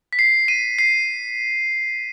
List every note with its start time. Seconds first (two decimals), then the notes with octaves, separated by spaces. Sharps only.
0.13 B6
0.19 C7
0.48 D#7
0.79 C7